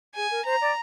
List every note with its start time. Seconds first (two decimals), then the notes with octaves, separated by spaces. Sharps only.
0.16 G#4 G#5
0.31 A#4
0.45 C5 A#5
0.61 D5